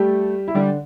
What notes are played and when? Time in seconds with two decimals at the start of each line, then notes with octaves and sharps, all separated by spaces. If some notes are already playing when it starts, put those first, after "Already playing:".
Already playing: G3 A3 G4
0.48 E4
0.54 D3 G3 D4